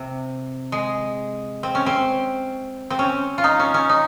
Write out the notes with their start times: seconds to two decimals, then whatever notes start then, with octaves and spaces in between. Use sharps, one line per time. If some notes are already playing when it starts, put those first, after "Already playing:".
Already playing: C3
0.72 G#3
1.63 C4
1.75 C#4
1.86 C4
2.90 C4
2.99 C#4
3.38 F4
3.44 D#4
3.60 C#4
3.74 C#4
3.89 D#4